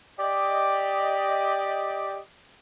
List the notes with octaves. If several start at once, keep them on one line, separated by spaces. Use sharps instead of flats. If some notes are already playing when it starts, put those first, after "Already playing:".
G4 D5 D#5